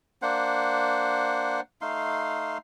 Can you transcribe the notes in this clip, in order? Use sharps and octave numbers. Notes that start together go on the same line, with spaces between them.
A#3 D4 C5 F#5
A3 D#4 F5 C6